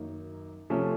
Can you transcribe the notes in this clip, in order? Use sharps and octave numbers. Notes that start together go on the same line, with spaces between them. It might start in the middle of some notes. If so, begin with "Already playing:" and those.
Already playing: F#2 D#3 A#3 D#4
C3 F3 A3 C#4